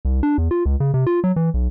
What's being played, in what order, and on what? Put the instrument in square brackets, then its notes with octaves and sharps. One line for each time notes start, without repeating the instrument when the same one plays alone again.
[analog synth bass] C2
D4
E2
F4
C#2
C#3
C3
F4
F#3
E3
B1